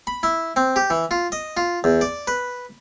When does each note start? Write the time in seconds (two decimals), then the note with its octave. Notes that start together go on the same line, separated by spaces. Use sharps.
0.07 B5
0.23 E4
0.56 C4
0.76 G4
0.90 E3
1.11 F4
1.32 D#5
1.57 F4
1.84 E2
2.01 D5
2.27 B4